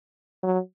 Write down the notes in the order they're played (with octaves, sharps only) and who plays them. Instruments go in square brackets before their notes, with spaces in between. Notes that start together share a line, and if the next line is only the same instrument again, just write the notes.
[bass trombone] F#3